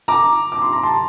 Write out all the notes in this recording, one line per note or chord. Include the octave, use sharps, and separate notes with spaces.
A#5 D6
D6
C6
A#5
A5 C6